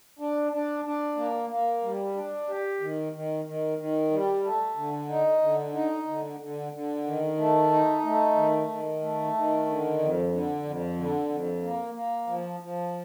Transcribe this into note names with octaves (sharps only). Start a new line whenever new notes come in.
D4
D4
D4
A#3
A#3
G3
D4
G4
D#3
D#3
D#3
D#3
G3
A3
D3
D#4
D3
D#4
D3
D3
D3
D#3
A3
D#4
A3
D#3
D#3
A3
D#3
D3
F2
D3
F2
D3
F2
A#3
A#3
F3
F3